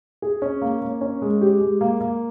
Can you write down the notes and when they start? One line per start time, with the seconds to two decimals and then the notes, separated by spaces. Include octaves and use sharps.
0.22 G#4
0.42 C#4
0.62 A#3
0.82 A#3
1.01 C#4
1.22 G#3
1.41 G4
1.61 G#3
1.81 A#3
2.01 A#3